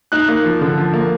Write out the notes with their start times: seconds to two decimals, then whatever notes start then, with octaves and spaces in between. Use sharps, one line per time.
0.12 D#4 F#6
0.28 A#3
0.44 F3
0.61 D3
0.78 F3
0.93 A#3